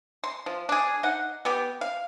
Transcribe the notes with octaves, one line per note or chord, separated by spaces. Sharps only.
C6
F3
D4 G#4
D#4 F#5
B3 G4
F5